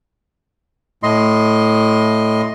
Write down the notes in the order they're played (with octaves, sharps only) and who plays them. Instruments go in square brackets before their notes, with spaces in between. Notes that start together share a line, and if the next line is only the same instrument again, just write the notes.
[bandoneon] A2 D#5 C6